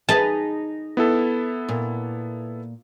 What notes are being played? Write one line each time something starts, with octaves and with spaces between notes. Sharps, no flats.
D#4 G#4 B4 A5
B3 E4 A4
A#2